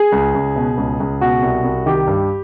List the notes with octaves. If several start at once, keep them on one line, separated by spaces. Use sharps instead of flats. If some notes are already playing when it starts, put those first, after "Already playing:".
Already playing: G#4
C#2
C#2
B2
C#2
C#2
B2 F#4
C2
C2
D#3 G4
G2